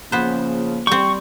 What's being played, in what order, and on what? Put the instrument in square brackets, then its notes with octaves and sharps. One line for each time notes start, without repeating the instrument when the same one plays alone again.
[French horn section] C#3 F3 [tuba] A#3 [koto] B3 C5
[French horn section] G3 [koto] C4 G5 [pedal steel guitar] C#6